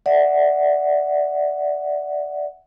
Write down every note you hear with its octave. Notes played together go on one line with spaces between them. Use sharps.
D5 E5 F#5